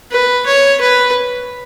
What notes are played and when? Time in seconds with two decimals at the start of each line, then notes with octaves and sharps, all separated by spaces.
0.11 B4
0.46 C#5
0.81 B4